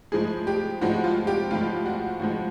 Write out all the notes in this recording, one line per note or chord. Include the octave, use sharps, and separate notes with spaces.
A2 F3 G#3 G#4
G4
A2 F3 G#3 F#4
F4
G4
A2 F3 G#3 F4
F#4
A2 F3 G#3 F#4